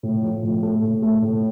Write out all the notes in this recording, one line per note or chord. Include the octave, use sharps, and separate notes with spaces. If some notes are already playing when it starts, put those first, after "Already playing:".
A2
F3
A2
A3
A2
A3
A2